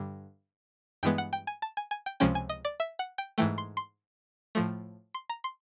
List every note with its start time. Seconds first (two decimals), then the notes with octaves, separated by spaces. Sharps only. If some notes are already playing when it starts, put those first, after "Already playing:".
Already playing: G2 D3
1.03 G2 E3 G#3 B3 G5
1.18 F#5
1.33 G5
1.47 G#5
1.62 A5
1.77 G#5
1.91 G#5
2.06 G5
2.20 C#2 C3 F3 G#3 C#4 G5
2.35 G#5
2.49 D#5
2.65 D5
2.80 E5
2.99 F#5
3.18 G5
3.38 G#2 E3 A3 G5
3.58 C6
3.77 C6
4.55 A2 F3 A3
5.14 C6
5.30 A#5
5.44 C6